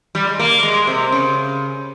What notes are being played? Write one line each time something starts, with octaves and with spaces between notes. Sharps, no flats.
G3
G#3
A#3
G#3
C3
C#3